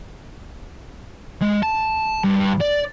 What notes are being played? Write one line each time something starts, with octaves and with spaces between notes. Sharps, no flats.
G#3
A5
G2
D5